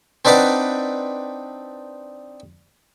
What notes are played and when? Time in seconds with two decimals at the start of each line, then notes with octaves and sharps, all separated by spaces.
0.25 C4 D4 D#4 B4 D5 F#5